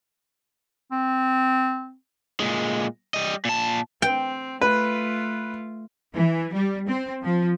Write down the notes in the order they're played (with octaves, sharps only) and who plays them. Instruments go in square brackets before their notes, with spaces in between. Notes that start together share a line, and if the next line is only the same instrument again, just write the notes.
[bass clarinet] C4
[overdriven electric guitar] A#2 G#3
G3 D#5
A#2 A5
[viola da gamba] C4 [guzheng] G5
[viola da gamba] A3 F4 [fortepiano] B4
[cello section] E3
G3
C4
F3